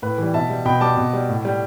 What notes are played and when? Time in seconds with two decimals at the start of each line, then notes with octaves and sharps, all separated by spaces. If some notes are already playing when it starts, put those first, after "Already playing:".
0.02 A2 B4
0.18 E3 G3
0.34 B2 E5 A5
0.49 G3
0.65 B2 G5 B5
0.81 G3 A5 D6
0.97 B2
1.13 G3
1.28 A2
1.45 G3